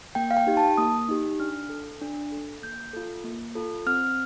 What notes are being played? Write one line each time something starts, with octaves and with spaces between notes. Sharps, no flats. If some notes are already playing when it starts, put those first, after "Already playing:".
A#3 G5
F5
G5
D#4 G4
A5
A#3 D#6
D#4 G4
D4 F6
A4
D4
A4
A#3 G6
F4 A4
A#3
F4 A4
C4 F6